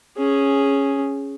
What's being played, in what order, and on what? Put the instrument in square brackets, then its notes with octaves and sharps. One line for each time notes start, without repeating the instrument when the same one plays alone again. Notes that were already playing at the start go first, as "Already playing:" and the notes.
[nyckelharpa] C#4 G#4